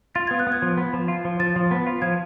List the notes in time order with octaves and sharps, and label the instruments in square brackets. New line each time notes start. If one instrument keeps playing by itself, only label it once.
[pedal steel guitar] F4 [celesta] A6
[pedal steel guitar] B3 [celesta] G#6
[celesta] F#6
[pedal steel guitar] B3
[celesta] G#6
[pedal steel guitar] F3
B3
F3
F4
F3
[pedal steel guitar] F3 [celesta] A6
[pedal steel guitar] F3
B3
F4
[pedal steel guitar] F3 [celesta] G#6